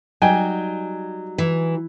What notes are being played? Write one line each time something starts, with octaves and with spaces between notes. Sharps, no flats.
F#3 G3 D#4 G5 G#5
E3